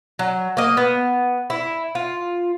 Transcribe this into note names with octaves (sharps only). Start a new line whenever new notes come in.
F#3
A#3 D#5
B3
E4
F4